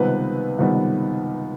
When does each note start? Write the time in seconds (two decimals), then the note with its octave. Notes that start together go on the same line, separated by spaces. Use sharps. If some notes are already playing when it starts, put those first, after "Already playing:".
Already playing: C#2 C3 D#3 G3 B3 B4
0.58 C#2 C3 D#3 G3 B3